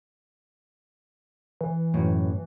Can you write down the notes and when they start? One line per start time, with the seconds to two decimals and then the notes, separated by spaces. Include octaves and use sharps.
1.61 E3
1.94 F#2 A2